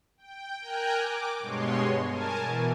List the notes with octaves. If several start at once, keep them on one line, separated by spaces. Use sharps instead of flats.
G5
A#4 G5 G#5 A#5 F#6
D6
G2 B2 G#3 C#5 C6
A#4 G#5 A5
B2 E3